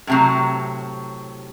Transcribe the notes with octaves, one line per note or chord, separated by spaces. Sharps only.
A2 C3 F#3